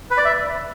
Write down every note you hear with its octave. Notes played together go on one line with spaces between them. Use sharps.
B4
D5
E5